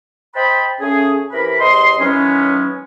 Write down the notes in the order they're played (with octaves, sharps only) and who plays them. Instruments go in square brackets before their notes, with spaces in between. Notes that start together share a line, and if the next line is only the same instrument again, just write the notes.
[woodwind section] C5 D#5 G5 A5 B5
C#3 A3 C#4 G#4
C3 E3 A#4 B5
E2 C3 D#5 C6
D#3 E3 F#3 G#3 B3 C#4